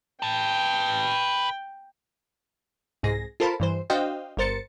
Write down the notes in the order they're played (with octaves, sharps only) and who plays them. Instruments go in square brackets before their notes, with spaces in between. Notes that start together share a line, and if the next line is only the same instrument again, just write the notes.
[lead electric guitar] B4 A5 [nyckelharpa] G5
[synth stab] C2 G#2 G#4 A#6
F4 A4 A#4 C5 A5 B5
G2 E3 C5
D4 F#4 C5 D#5 F5 G5
G1 G2 A#4 C5 A6 C#7